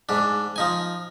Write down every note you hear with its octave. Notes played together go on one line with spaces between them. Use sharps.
G#2 D4
F3 D#4 G#5